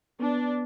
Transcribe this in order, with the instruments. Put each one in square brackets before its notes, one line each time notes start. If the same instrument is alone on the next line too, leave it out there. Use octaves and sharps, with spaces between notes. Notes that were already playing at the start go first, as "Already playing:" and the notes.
[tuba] B3 [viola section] D4